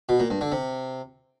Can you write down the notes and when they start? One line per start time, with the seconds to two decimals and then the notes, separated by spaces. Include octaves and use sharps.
0.09 B2
0.20 A#2
0.30 G2
0.41 D3
0.52 C3